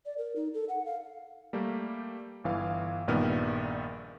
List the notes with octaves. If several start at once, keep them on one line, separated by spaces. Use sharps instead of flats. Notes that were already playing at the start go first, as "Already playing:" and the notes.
D5
A#4
D#4
A4
F#5
F5
G3 A3 A#3 G4
G1 E3 F5
A#1 G2 A#2 D#3 B3 F6